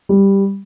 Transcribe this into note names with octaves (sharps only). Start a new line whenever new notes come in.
G3